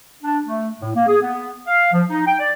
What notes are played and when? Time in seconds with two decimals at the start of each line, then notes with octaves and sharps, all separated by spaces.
0.23 D4
0.45 A3
0.81 A2
0.95 A#3
1.07 G#4
1.22 B3
1.66 F5
1.92 F3
2.09 D#4
2.27 G5
2.39 D5